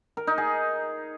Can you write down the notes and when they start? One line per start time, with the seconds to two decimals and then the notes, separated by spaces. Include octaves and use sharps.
0.17 A#4
0.27 D#4
0.38 G#4